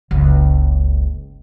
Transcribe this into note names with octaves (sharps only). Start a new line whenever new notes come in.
F#1 C#2